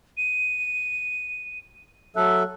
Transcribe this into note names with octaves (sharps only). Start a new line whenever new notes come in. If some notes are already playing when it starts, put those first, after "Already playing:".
D#7
F#3 A4 E5 F#6